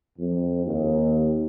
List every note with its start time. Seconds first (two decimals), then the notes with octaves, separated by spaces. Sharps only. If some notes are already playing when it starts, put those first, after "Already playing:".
0.18 F2
0.66 D#2